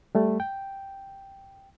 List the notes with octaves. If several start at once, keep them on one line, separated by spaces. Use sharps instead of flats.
G3 A3
G5